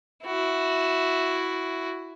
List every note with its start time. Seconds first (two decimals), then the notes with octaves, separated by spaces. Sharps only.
0.24 E4 F#4